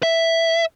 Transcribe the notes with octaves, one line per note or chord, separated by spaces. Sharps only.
E5